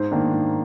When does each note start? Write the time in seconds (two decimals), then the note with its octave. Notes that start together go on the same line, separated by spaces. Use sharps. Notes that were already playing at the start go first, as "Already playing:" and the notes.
Already playing: G#2 C5
0.11 D#3 A#3 D4
0.33 G#2